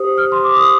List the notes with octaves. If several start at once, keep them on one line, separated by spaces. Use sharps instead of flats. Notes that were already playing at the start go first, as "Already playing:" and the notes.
Already playing: G4 C5 D#6
F6
C6
D6
D#6